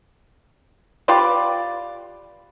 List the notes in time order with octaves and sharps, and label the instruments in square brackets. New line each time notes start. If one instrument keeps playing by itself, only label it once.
[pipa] F4 G4 B4 D5